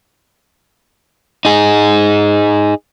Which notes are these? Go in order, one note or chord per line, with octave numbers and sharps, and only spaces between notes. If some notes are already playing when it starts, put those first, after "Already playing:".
D#4 G#4